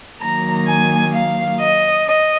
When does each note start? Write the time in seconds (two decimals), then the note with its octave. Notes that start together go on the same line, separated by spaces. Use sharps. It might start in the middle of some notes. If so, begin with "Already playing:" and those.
0.21 D#3 F#3 A#3 A#5
0.67 G#5
1.13 F5
1.60 D#5
2.06 D#5